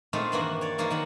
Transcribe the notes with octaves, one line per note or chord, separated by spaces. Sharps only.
A#2 G#3 A3 C4 D#4 F4
G2 D#3 E3 A#3 D4 F#4
C#5 D5
E3 F3 G#3 A#3 D#4
D#3 F#3 F#5